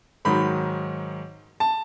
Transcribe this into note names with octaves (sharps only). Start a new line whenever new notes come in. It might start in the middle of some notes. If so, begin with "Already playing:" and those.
G#2 D#3 F#3 B5
A5